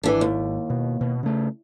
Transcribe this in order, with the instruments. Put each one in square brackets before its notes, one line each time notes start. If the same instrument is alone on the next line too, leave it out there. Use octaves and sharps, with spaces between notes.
[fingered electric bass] G#1 [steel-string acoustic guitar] E3 D4
[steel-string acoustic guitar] D#2
[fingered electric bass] B2
B2
C#3 A3